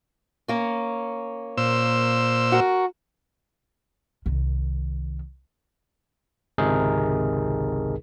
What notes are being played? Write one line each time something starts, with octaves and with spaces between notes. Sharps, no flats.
A#3 C#4
A#2 C5 E6
F#4 A#4
C2 D#3
G#1 C#2 C3 D#4 G#4 A#4